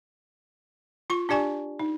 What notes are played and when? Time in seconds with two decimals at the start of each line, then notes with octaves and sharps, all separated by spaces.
1.10 F4 C#6
1.29 D4 G4 D5 G#5 C#6
1.79 D#4